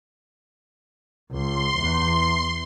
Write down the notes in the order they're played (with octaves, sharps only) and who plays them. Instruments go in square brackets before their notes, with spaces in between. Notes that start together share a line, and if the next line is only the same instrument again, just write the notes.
[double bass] C#2 [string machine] C6
[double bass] E2